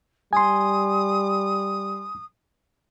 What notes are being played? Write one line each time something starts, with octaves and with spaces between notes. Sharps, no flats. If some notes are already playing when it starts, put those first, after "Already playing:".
G3 G#5 C6 D#6